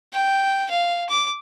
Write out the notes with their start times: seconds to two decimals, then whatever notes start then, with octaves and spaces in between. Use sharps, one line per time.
0.13 G5
0.70 F5
1.09 D6